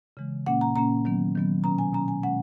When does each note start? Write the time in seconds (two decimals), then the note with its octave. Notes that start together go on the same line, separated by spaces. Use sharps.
0.17 C#3 E3 G#3
0.46 A#2 A#3 C#4 F#5
0.61 A#5
0.76 A#2 A#3 C#4 A#5
1.05 D#3 F#3 B3
1.35 D#3 F#3 B3
1.64 B2 F#3 C#4 A#5
1.79 G#5
1.94 B2 F#3 C#4 A#5
2.08 G#5
2.23 B2 G#3 C#4 F#5